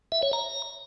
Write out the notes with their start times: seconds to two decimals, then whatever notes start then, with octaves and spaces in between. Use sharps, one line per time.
0.12 E5
0.23 C#5
0.33 A#5